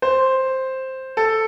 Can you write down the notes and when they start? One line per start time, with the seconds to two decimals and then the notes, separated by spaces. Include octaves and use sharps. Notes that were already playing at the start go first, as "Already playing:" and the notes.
0.02 C5
1.17 A4